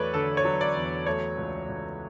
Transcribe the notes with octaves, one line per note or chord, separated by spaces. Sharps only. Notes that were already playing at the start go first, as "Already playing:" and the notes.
Already playing: E2 F#3 A3 B4 C#5 D5
D3 A4
C#5
F#3
D5
E2
A3 C#5
C#2
C#2